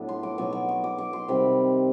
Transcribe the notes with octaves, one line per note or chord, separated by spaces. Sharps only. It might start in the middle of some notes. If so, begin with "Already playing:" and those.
Already playing: A2 F#3 B3 D4
C6
D6
B2 F#3 B3 D#4 C#6
D6
C#6
D6
D6
C6
C3 D#3 G3 C4 B5